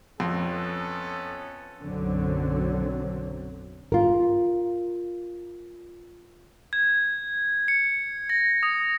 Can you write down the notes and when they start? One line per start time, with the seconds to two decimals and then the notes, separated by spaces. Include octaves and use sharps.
0.20 F2 B3 C#4 A4
1.82 B1 F#2 D3 F#3 C4
3.92 F4 A#4
6.73 G#6
7.68 C#7
8.29 A#6
8.63 D#6